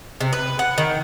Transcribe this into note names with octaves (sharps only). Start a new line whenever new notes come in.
C3
B4
F#5
D#3